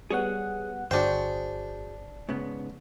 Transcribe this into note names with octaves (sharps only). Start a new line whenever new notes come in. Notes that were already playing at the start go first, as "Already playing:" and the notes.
G3 B3 G#4 C#5 F#5
G1 D4 F#4 G#4 C5 G5
G#2 C#3 B3